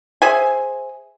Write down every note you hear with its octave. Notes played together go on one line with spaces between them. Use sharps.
G#4 C5 E5 G#5